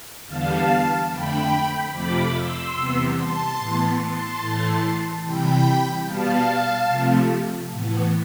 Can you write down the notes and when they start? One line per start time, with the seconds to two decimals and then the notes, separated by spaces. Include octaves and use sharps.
0.26 E2 D3 G3 B3 F5 A5
1.09 F2 D3 A3 G5 B5
1.91 F2 C3 F3 A3 B5 D6
2.33 C6 E6
2.74 E2 C3 G3 B3
3.16 A5 C6
3.58 A2 E3 B3
3.98 A5 C6
4.39 A2 E3 A3
5.22 C3 E3 G3 G5 B5
6.05 B2 G3 B3 F5 A5
6.88 C3 F3 A3
7.71 A2 E3 B3